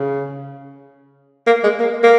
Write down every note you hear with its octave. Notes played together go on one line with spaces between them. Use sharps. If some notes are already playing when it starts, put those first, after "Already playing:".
Already playing: C#3
A#3
G#3
A#3
A#3